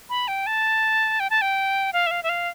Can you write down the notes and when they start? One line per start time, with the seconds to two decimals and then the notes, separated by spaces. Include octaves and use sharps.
0.10 B5
0.28 G5
0.47 A5
1.20 G5
1.30 A5
1.41 G5
1.93 F5
2.07 E5
2.11 F5
2.23 E5
2.29 F5